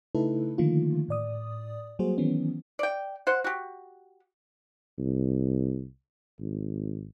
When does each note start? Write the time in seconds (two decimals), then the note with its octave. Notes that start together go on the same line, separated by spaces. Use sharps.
0.15 C#3 A3 D#4 E4 A4 B4
0.58 D3 D#3 F3 A3 A#3 F4
1.09 A2 D5 D#6
1.99 F#3 G3 A#3 F#4 G#4 C5
2.18 D#3 E3 F#3 B3 C#4
2.79 D5 G5
3.27 C5 F#5
3.44 F#4 G4
4.98 C2
6.40 G#1